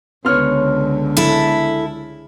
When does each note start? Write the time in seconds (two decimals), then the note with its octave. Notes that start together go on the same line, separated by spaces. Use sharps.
0.25 C#2 D3 B3 C#5 C6 F6
1.17 G#3 E4 A4